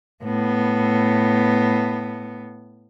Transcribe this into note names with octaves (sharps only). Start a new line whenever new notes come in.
A2 B3